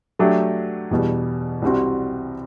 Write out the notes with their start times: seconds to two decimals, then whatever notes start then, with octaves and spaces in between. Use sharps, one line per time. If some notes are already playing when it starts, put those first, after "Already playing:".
0.19 F#3 A3 D4 G4
0.91 E2 B2 G3
1.62 C2 C3 G3 C4 F#4